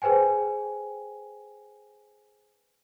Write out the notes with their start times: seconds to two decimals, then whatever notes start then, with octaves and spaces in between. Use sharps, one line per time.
0.02 G#4 B4 C5 G5 G#5